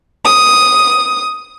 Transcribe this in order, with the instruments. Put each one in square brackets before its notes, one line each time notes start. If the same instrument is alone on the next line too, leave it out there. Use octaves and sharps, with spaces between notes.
[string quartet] D#6